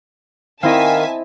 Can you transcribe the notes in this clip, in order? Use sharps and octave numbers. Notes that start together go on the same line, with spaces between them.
D#3 C4 E4 D#5 F5 G#5 A5 B6